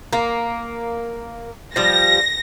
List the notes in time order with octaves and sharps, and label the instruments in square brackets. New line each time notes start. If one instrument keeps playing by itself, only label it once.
[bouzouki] A#3
[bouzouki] F3 G3 [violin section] A#6